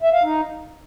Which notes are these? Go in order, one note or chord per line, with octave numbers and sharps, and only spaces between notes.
E5
F5
D#4